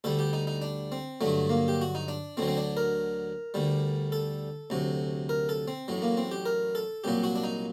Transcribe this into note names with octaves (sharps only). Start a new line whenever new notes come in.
D2 D3 G3 A4
G4
D#4
D#4
D4
C4
G2 D3 F#3 A3
A#3
G4
F#4
D#4
D4
D2 D3 F#3 C4
C4
D4
A#4
D2 D3 G3
A4
D2 C3 F#3
A#4
A4
C4
A1 A2 F#3
A#3
C4
G4
A#4
A4
C2 A#2 F#3 G4
F#4
D4
D#4